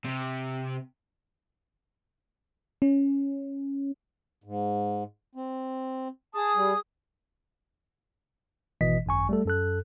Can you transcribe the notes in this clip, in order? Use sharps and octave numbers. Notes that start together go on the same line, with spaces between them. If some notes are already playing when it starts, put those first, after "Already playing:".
C3
C#4
G#2
C4
G#4 A5 D#6
G3
G#1 B2 E3 D#5 B6
G#1 F#2 G#5 C#6
G3 A3 A4
F#2 A4 F#6